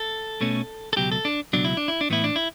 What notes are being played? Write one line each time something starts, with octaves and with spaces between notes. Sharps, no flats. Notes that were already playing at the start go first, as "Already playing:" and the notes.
Already playing: A4
B2 A3 C#4
A4
C#2 B2 F#3 G4
A4
D4
C#2 B2 F#3 D4
E4
D4
E4
D4
A2 E3 B3 E4
D4
E4